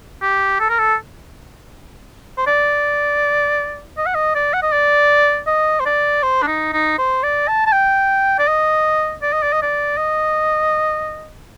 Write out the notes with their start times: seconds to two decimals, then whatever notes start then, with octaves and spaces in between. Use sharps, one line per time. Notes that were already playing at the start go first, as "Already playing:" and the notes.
0.22 G4
0.60 A4
0.69 A#4
0.79 A4
2.37 C5
2.47 D5
3.97 D#5
4.06 F#5
4.15 D#5
4.35 D5
4.53 F#5
4.62 D#5
4.72 D5
5.47 D#5
5.80 C5
5.86 D5
6.23 C5
6.42 D4
6.47 D#4
6.73 D#4
6.98 C5
7.23 D5
7.48 A5
7.66 A5
7.72 G5
8.39 D5
8.48 D#5
9.22 D5
9.33 D#5
9.43 D5
9.53 D#5
9.62 D5
9.97 D#5